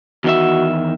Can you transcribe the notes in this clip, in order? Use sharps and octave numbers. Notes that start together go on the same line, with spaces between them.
E2 D#3 F#4 E5